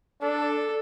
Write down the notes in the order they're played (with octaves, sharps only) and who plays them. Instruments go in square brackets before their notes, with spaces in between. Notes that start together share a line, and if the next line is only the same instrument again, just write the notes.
[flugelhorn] D4 [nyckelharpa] A4